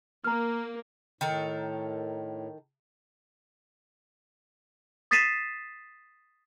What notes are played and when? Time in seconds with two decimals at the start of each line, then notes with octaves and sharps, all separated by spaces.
0.24 A#3 A#5 F6
1.21 A2 D#3 A4 A#4
5.11 D#6 A6 B6 C7 D#7 E7